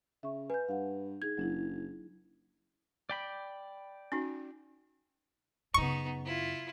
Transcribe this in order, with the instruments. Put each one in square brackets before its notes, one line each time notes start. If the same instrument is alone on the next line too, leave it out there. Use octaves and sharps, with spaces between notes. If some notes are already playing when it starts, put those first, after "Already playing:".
[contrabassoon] C#3 [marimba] E5 C#6
[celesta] B4 [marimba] G#5 G6
[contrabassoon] G2 [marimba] F5 F#5
[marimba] D#4 G#4 [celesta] G#6
[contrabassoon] F#1 [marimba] F#3 D4 E4
[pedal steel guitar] D5 G5 B5
[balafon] C#4 D#4 F#4
[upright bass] F#2 C#3 [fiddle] B3 D#4 [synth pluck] C#6
[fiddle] E4 F4